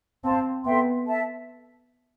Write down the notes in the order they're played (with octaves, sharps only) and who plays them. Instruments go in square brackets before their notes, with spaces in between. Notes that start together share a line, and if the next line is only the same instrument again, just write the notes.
[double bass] C4 [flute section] C5 F5 A5 C6
[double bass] B3 [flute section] A4 E5 G5 C6
[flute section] A4 E5 A5